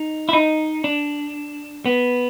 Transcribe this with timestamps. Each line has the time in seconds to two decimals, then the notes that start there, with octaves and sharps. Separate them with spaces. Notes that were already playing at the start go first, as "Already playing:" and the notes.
Already playing: D#4
0.29 E4
0.33 D#4
0.84 D4
1.86 B3